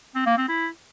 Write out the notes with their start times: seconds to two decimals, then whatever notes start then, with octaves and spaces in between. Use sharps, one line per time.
0.15 C4
0.26 A#3
0.37 C4
0.49 E4